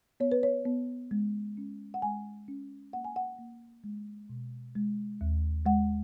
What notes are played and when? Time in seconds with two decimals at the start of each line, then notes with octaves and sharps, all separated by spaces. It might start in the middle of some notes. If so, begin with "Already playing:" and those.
0.20 B3 C#5
0.32 B4
0.43 C#5
0.65 B3
1.11 G#3
1.57 C#4
1.94 F#5
2.02 G#3 G#5
2.48 C#4
2.93 A#3 F#5
3.05 G#5
3.16 F#5
3.39 A#3
3.84 G#3
4.29 B2
4.75 G#3
5.21 D#2
5.66 G#3 F#5